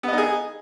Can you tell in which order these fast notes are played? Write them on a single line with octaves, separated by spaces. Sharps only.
B3 D#5 D#4 G#4